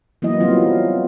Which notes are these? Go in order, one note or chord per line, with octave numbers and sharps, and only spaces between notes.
E3 F#3 A#3 B3 E4 D#5
F#3 G3 A#3 C4 F4